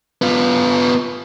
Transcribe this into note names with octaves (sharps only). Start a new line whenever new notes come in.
B3 F4